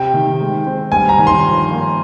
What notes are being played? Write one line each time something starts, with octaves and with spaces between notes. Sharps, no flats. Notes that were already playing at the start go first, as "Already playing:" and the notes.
Already playing: C3 G5
D#3
G#3
C4
G2 G#5
A#5
D#3
C6
F3
A#3